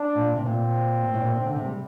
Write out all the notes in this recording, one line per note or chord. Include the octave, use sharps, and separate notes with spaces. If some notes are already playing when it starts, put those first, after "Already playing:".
Already playing: D4
A#2
C3
A#2 C4
A#2
A2
A#2
C3
D3
C3
A3
G3